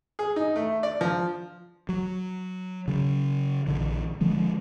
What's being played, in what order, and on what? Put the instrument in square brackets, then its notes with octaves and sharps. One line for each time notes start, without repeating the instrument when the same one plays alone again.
[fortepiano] G#4
D#4
A3
D5
F3
[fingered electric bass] F#3
C#3 F#3
A#1 D3 E3
D3 F3 G#3